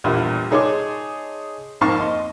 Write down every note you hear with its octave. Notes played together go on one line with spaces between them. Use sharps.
A#1 E2 A#2 G3 C6
D#4 G#4 C#5 A5 C6 D6
F2 G#2 A#3 F5 A5 C#6
D#5 C6